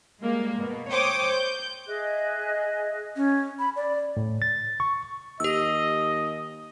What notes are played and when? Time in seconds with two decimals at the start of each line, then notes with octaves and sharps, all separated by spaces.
0.22 G3 G#3 A#3
0.58 B2
0.90 C5 C#5 G5 D6 D#6
1.29 G6
1.87 G#4 D#5 E5 F#6
3.16 C#4
3.59 B5
3.76 D5
4.17 A2
4.42 A6
4.80 C#6
5.40 D#2 G4 D#5 E6